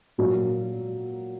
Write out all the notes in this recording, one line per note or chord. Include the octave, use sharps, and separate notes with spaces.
A#2 F#3 A#3